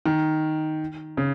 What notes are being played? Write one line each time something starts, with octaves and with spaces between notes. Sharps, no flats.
D#3
C#3